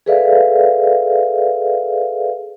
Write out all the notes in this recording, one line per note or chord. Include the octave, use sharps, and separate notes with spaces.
G#4 A4 B4 D5 E5 F5